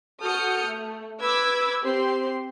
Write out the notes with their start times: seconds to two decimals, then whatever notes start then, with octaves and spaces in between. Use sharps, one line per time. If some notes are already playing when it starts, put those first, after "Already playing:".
0.22 F#4 A4 D#6 F6 G6 C#7
0.65 A3
1.21 B4 B5 D6 E6 G#6
1.83 C4 G4 C5 C6